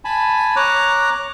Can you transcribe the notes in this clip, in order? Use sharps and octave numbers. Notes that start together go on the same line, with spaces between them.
G#5 A5 B5
C#5 A#5 D6 F#6